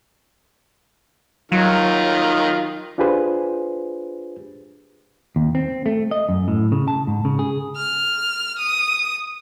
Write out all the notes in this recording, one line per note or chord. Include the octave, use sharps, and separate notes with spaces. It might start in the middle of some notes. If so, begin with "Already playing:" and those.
D#3 F#3 F4
D4 F4 G4 G#4 B4 C5
D#2
C4
A3
D#5
F#2
A2
C#3
A5
G#2
C#3
G#4
F6
D#6